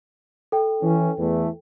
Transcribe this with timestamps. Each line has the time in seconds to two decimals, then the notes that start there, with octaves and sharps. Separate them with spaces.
0.52 A4 G5
0.82 E3 C#4
1.18 E2 E3 A3